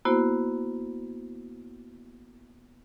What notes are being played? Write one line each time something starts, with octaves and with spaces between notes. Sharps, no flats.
A#3 B3 E4 F#4 C5